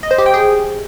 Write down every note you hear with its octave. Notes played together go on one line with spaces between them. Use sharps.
D#5
C5
G4
G5
G#4